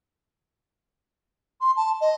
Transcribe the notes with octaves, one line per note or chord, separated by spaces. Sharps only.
C6
A5
D#5